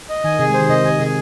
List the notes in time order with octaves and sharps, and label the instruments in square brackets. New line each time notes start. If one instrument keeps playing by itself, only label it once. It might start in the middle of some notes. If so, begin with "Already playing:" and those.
[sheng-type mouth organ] D#5
[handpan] D#3 [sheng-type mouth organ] G#5
[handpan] C3 [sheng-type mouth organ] G#4
[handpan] G#3
[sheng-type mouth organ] C5
[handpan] D#3
[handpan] C3 [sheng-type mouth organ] D#5
[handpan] D#3 [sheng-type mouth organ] G#5
[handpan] C3 [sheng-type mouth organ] G#4